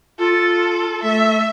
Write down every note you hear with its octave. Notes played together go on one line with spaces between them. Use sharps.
F4 A4
A3 E5